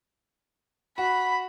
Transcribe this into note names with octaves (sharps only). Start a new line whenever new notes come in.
F#4 B5